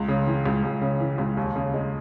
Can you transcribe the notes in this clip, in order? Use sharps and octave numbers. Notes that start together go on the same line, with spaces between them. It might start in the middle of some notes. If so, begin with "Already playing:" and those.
Already playing: C#2
C#3
E3
C#2
C#2
C#3
E3
C#2
D#2
C#3
G#3